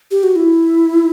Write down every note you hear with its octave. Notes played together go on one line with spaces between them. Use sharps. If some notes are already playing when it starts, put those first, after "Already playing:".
G4
F#4
E4